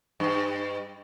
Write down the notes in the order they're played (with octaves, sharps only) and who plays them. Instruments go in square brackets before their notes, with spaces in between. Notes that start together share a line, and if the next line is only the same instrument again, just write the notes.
[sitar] G2